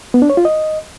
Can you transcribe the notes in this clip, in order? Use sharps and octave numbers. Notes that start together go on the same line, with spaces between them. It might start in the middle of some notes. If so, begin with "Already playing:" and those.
B3
D4
C#5
F4
D#5